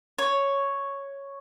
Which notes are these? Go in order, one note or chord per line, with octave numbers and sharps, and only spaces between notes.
C#5